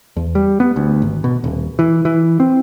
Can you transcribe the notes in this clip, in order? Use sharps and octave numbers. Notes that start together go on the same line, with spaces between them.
E2
G3
B3
D2
G#1
B2
D#1
E3
E3
C4